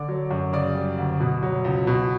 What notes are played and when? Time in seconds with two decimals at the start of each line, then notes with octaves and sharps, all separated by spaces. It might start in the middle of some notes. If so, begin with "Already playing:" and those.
Already playing: D3 D5 D6
0.08 F#3
0.31 F#2
0.53 C#3 D5 D6
0.75 G3
0.98 D2
1.20 B2
1.43 F#3
1.64 C#2
1.87 B2